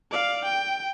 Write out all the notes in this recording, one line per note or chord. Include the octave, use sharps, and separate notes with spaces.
D5 F5
G5